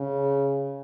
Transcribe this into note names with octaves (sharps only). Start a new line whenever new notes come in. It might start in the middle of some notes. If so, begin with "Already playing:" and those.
Already playing: C#3